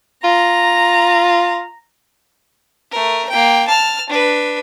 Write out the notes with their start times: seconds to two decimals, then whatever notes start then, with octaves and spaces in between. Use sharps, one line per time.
0.24 F4 A#5
2.91 A3 A#4
3.30 A#3 G5
3.68 A5 F6
4.09 D4 B4